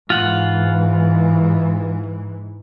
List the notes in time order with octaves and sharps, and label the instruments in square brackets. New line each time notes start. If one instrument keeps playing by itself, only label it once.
[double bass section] G#2 E3 [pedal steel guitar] F4 F#5